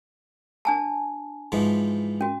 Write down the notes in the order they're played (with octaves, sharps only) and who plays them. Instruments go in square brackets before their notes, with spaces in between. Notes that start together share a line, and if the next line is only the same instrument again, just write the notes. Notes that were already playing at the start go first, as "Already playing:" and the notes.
[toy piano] D4 G#5 A5
[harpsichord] G#2 E3 F3
[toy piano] C#4 F#4